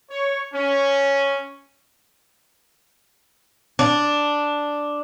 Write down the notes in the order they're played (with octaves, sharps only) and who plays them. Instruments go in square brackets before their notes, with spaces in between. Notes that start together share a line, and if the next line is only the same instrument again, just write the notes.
[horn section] C#5
C#4
[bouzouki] D4